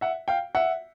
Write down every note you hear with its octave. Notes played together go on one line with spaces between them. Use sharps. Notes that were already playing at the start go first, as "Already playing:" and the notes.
E5 F#5
F5 G5
E5 F#5